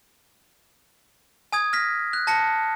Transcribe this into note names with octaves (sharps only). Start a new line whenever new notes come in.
G#5 D#6 G#6
F6 A#6 B6
F#6
A5 A#6 C#7